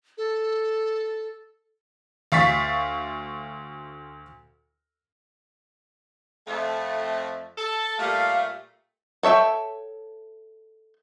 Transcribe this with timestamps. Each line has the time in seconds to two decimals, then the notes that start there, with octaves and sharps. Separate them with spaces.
0.18 A4
2.32 D2 F5 C#6 A6 B6
6.47 F2 A3
7.58 A4
7.99 A#2 G3 A3 F5
9.23 A4 C#5 E5 G5